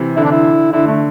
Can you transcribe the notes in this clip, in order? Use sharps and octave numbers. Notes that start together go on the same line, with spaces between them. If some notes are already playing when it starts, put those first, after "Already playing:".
Already playing: C3 E3
D3 E4
D4
E4
D3 E4
D3 A3